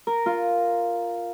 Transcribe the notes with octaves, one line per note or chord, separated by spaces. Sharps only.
A#4
F4